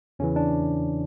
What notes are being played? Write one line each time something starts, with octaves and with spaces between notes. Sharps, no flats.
E2 C#3 E3 C#4
D4